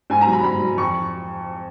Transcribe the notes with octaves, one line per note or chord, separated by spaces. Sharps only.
G#2 G#5
A#5
F#3
B5
G#2 B5
F#3
F2 C#6